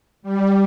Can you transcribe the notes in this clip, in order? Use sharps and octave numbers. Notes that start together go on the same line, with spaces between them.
G3